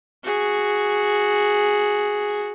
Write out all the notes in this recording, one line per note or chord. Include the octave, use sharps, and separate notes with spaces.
F#4 G#4